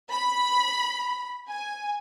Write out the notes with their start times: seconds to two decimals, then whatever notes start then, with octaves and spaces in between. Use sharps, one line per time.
0.11 B5
1.48 G#5